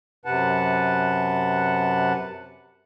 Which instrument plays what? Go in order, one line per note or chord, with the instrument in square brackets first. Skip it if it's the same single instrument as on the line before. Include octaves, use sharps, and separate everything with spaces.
[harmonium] F#2 C3 B4 F#5 A5